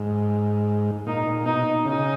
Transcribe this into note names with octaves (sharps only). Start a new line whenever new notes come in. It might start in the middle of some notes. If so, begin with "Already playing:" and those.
Already playing: G#2
A#2 D#4
A#2
B2 D#4
C#3 D#4